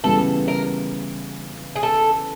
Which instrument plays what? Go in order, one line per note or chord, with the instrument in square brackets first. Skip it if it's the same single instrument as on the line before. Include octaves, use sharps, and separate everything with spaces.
[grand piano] C#3 E3 G3 B3 [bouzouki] A4
[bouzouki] A#4
G#4
A4